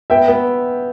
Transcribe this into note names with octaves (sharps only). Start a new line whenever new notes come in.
B3 E5 G5
B3